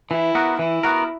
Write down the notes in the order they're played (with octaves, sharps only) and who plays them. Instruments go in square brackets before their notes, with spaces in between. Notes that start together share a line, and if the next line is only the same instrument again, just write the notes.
[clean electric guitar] E3 [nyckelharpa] E4
[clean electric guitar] B3 F#4 A#4
[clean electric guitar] E3 [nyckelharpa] E4
[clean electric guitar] B3 F#4 A#4